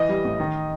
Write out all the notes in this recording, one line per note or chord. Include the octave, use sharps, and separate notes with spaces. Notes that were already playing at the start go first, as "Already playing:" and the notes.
Already playing: E3 D#5
G3
A1
D#3